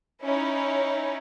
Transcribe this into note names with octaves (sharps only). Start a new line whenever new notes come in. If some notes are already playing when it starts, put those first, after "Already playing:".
C#4 D#4 E4 C#5